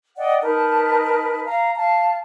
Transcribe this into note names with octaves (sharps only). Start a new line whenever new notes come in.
D5 D#5 F#5 G5
D#4 A#4 B4 A5
F5 A#5
F5 A5